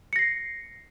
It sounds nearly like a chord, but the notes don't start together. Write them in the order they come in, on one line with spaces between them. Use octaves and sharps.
C#7 A#6 C7